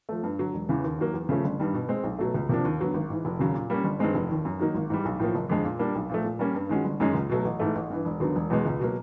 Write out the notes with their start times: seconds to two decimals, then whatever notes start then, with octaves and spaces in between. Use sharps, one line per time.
0.09 F3 A3
0.23 G2
0.39 D3 F#3
0.54 E1
0.69 E2 C#3 E3
0.84 D#2
0.99 D#3 F#3 A#3
1.14 E2
1.29 C#3 F3 A3 C#4
1.44 G1
1.59 G2 D#3 G3
1.74 B2
1.89 G#3 C4
2.04 B1
2.19 B2 F#3 A3
2.34 C#2
2.49 C3 F3 A#3 D4
2.65 D#2
2.80 D3 F#3 B3
2.94 G#1
3.10 G#2 E3
3.25 F1
3.39 D#2 C#3 F#3
3.54 A#2
3.70 G3 A#3 C#4
3.84 G1
3.99 G2 D#3 G#3 C4
4.14 F1
4.29 D#2 D#3
4.45 F#2
4.59 D#3 F#3 A#3 D#4
4.75 G#1
4.90 G#2 E3 G3
5.05 B1
5.19 A2 F3 A#3
5.35 F#1
5.49 F2 D3 F3 G#3
5.65 A#2
5.79 G3 A#3 D4
5.95 B1
6.09 A#2 F3 A3
6.24 A#2
6.39 G3 A#3 C#4
6.54 G2
6.69 D#3 G#3 C#4 F#4
6.84 G1
7.00 F#2 D#3 G#3 C#4
7.15 C#2
7.29 B2 F#3 A3
7.45 A1
7.60 G#2 E3 A3
7.75 A1
7.90 G2 E3
8.05 E1
8.20 D#2 D3 F#3 B3
8.36 E1
8.50 E2 B2 G#3
8.65 C#2
8.80 B2 F#3 A#3